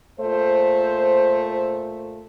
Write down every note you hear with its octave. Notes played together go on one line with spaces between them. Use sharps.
A#2 A3 C5